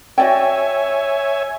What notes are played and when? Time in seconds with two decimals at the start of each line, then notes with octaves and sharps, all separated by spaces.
0.18 F#4 C#5 D5 E5 G5 G#5